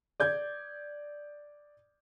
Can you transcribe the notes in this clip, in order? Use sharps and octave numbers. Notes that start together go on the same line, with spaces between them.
D5 G6 G#6